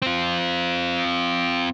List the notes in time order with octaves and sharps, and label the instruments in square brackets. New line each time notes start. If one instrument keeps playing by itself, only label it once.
[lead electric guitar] C4 F4